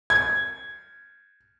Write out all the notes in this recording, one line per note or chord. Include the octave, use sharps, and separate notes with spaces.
G#6